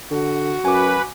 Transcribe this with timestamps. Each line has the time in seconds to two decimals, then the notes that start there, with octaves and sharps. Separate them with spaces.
0.11 D3 F#4
0.65 F#2 B4 G#5 D6